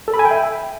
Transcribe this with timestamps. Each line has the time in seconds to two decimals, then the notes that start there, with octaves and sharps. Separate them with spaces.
0.08 A4
0.14 B5
0.19 G#5
0.25 G5
0.31 E5